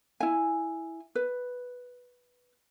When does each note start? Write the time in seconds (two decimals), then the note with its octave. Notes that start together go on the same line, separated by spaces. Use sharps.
0.20 E4 G#5
1.15 B4